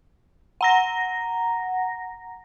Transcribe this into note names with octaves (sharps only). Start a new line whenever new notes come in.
F#5 A#5 A#6